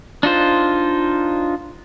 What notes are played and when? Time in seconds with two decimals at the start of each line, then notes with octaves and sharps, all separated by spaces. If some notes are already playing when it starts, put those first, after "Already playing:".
0.23 D4 D#4 F4 C5